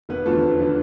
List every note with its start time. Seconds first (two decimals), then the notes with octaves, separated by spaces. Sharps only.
0.09 F1 B3 B4
0.25 E2 D3 F3 A3 A4
0.43 F1
0.59 D3 F3